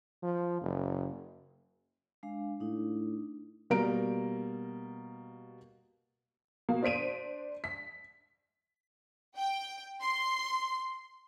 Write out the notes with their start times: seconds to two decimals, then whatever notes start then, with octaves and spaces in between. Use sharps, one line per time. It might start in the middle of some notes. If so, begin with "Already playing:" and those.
0.23 F3
0.62 F#1
2.23 G#3 D4 F5
2.60 A2 D4 D#4
3.70 B2 G3 A#3 A#5 D7
6.69 B2 A#3
6.83 D4 C5 B6 D7 D#7
7.64 B6
9.36 G5
10.01 C6